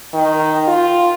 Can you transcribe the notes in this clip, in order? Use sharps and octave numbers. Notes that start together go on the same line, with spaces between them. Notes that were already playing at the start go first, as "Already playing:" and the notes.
D#3
F4